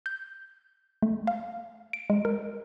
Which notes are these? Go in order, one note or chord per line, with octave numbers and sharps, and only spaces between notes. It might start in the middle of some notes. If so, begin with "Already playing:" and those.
G6
A3
F5
D7
G#3
A#4